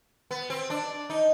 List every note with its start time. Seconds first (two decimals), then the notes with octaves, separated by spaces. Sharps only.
0.31 B3
0.50 C4
0.70 D4
1.10 D#4